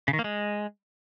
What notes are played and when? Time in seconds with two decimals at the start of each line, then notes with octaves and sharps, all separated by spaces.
0.08 C#3
0.13 D#3
0.19 A#3
0.24 G#3